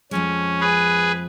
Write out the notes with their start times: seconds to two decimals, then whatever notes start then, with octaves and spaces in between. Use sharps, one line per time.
0.11 F2 F3 G#3 C#4
0.60 G#4 B4